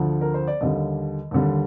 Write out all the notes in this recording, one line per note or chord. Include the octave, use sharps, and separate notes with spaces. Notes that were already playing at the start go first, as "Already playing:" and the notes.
Already playing: D2 D3 F3
A#4
C5
D5
D#2 D3 G3 D#5
D#2 D3 G3